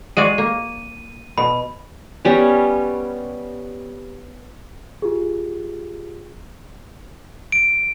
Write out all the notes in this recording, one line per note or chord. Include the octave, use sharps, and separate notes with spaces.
G#3 F#4 D5 D#7
A#3
B2 B5
G3 B3 C#4
F4 G4 G#4
D7